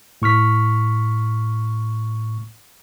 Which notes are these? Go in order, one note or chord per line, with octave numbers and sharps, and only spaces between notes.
A2 C#6 F6 B6